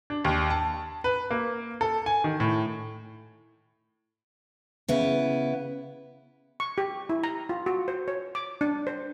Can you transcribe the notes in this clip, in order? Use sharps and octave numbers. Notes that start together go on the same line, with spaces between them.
D4
D#2
A5
B4
A#3
A4
G#5
D#3
A2
C#3 B3 E4
C#6
G4
E4
A#5
F4
F#4
C5
C#5
D6
D4
C5